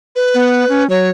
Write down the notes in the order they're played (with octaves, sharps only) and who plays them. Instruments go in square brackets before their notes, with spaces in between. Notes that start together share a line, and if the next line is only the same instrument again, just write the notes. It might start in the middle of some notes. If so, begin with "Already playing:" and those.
[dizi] B4
[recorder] B3
C#4
[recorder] F#3 [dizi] C#5